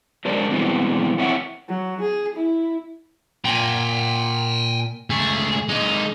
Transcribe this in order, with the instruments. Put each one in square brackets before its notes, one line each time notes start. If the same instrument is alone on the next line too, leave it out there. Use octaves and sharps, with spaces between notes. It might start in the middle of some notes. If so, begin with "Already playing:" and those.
[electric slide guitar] F#3 G#3 D4 A#4 C5 D5
B2 E3 G3 G#3 C4
C4 E4 C#5 E5 F#5
[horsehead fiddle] F#3
G#4
E4
[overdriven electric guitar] A#2 [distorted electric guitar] G5 G#5
[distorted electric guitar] C#2 A3 [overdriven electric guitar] G#4
[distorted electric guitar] G#3 A#3 [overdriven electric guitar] D#4